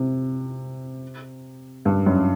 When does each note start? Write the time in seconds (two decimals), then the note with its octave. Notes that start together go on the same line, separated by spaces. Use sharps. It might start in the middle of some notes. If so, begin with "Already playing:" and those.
Already playing: C3
1.85 G2
2.06 F#2